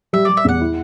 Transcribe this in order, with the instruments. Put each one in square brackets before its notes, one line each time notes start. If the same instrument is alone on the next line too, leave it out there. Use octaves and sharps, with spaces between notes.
[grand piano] G3 [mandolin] E5
[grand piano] G3 [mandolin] D5
[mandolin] E5
[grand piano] E2 [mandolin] F#5
[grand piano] E4